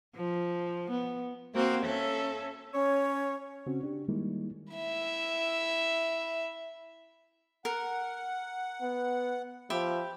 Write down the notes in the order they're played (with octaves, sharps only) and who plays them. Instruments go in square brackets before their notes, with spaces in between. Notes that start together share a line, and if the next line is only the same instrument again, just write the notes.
[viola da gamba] F3
B3
[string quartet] A#3 C4 F#4 C5 F5
C#4 A4 E5
[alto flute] C#4 [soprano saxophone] C#5
[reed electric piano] C#3 C4 C#4 F#4
D4 G4
D#3 G3 G#3 A#3 D#4 E4
[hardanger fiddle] E4 E5
[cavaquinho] A#4 [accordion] F#5
[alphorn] B3
[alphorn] F3 [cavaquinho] G4 E5 B5